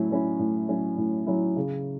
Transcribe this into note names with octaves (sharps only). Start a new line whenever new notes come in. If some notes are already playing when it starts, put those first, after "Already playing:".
Already playing: A2 F#3 C#4 E4
F#3 C#4 E4
A2
F#3 C#4 E4
A2
F#3 C#4 E4
C#3